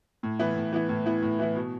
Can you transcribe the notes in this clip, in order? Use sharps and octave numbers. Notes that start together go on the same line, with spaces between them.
A2
E3 B3 E4
A2
E3 B3 E4
A2
E3 B3 E4
A2
E3 B3 E4
B2